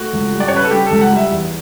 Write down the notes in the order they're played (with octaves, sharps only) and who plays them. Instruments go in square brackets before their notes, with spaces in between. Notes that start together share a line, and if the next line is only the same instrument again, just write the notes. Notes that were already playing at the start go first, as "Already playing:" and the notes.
Already playing: [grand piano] A3 [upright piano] F#4
[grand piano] C#2
G3
[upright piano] D5
C#5
[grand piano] C#3 [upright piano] B4
[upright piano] A4
[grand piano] G3 [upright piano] G4
[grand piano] C#2 [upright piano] A4
[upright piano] F#5
[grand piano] G3 [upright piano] E5
[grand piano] E2